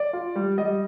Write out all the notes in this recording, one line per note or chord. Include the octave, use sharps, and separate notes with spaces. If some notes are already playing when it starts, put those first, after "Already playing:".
Already playing: D5
F4
G3
G3 D#5